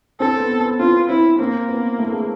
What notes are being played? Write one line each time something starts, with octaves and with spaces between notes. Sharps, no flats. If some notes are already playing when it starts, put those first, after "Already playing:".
C4 A4
B3
B3
C4 F4
C4 E4
A#3 C4
B3
A3
G#3